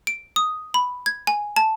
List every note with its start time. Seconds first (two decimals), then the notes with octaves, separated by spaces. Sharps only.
0.07 D7
0.36 D#6
0.74 B5
1.06 G#6
1.27 G#5
1.56 A5